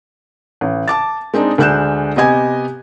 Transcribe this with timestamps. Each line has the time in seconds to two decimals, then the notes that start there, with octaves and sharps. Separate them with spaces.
0.61 A1
0.88 A5 D6 A6
1.33 G#3 C4 D4 D#4
1.58 D2 G#3 D4 F#6 G6 E7
2.16 C3 B3 G4 D#5 G#5 G#6